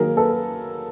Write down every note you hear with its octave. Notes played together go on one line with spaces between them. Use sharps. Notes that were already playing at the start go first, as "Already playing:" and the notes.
Already playing: D#3 F#3 A#3 G#4 A#4
A4 B4